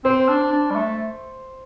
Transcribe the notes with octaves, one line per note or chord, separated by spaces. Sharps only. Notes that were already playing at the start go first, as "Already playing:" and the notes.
C4 C5
D4
D4
G3
A3